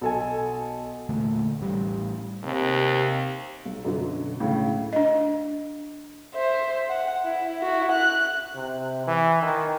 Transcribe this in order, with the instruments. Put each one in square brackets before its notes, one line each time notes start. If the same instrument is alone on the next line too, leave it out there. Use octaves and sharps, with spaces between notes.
[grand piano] B1 A4 G#5
[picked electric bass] E2 A#2 D3 A3
A1 A2 G3
[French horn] D#2 [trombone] C3
[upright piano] B1
F#2 B2 D3 F#3
C#2 A2 C#3
[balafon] D4 D#5
[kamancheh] C5 E5
F#5
E4
E4 F#4
F#6
[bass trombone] C3
E3
D#3